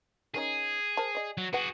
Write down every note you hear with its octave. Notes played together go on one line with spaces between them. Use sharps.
D#3 C#4 D#4 G#4
A#4 C5 A5
D5 D#5
F#3
F#4 G#4 B4 F#5